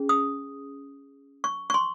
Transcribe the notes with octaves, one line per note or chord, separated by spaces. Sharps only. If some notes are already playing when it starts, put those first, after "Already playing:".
Already playing: C#4 G#4
D#6
C#6
C#6
C6